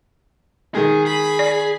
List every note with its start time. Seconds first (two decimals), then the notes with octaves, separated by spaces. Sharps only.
0.75 D#3 G#3 G#4
1.05 G#4 B5
1.39 D5